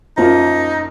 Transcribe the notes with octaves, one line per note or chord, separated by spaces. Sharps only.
F#2 F3 A#3 D#4 F4